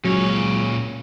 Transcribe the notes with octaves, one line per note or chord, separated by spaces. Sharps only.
C#2 A#2 F#3 C#4 C#5